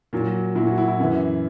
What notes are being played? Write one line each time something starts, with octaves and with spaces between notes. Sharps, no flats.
A#2 F#3
A#2 F#3 E4
F#4
E4
E4
F#2 E3